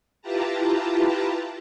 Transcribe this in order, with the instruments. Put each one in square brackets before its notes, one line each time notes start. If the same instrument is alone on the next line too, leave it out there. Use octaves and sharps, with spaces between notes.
[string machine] E4 F4 G4 B4 A5 A#5